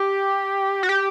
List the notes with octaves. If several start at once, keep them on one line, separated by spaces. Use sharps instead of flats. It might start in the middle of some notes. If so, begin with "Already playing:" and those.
Already playing: G4
F#4
G4